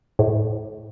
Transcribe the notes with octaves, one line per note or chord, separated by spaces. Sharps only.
A2